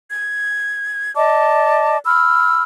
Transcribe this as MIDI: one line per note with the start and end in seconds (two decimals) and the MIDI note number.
0.11 1.14 92
1.16 1.97 74
1.16 1.97 75
1.16 1.97 81
1.16 1.97 86
2.06 2.63 83
2.06 2.63 88
2.06 2.63 89